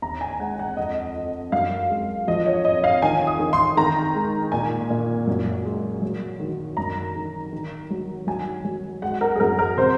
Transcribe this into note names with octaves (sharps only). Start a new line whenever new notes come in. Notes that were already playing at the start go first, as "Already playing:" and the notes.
D#2 A#5
G#5
G#3 F#5
F#5
F2 D#5
F2
F#2 F5
G#3
F3 D#5
C#5
F2 D#5
F5
D#3 G#5
D#6
D#3
C6
D#3 A#5
G#3
A#2 G#5
A#2
F#2
G#3
F#3
D#3
F#2 A#5
D#3
D#3
F#3
F#3 G#5
F#3
G#3 F#5
A#4
G#4
F#2 A#4
A#4
C3 C5